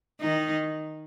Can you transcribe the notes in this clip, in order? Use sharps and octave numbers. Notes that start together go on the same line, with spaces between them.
D#3 D#4